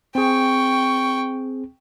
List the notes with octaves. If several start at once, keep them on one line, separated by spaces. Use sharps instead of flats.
C4 G#4 G5 C#6